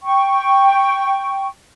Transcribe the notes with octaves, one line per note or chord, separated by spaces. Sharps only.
G5 C#6